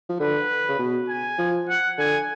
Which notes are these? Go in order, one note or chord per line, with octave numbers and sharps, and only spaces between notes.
F3
D3 B4
C#3
B2
G#5
F3
F#5
D3 G#5